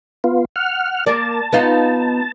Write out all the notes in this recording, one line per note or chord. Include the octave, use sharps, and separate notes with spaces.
B3 F4
F#5 F6
A#3 A#4 D5 A5
B3 D#4 F4